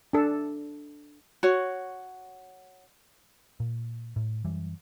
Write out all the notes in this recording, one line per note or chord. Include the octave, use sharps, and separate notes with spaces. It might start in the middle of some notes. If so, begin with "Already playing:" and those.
D4 A4
F#4 C#5
A#2
A2
F#2 E3 G3